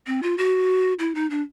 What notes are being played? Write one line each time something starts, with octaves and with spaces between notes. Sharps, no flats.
C4
F4
F#4
E4
D#4
D4